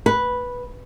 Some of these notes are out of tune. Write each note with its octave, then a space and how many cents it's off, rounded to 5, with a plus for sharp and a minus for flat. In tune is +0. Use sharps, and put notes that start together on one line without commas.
B4 -5